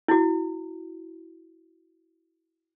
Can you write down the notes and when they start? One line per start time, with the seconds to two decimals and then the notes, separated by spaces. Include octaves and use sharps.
0.08 E4 F#4